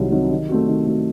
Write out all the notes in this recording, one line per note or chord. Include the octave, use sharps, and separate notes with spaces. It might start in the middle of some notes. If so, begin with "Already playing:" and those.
Already playing: C2 C3 D#3 F#3
C3 D#3 F#3
D#3
A3 C4 F#4
D#3
A3 C4 F#4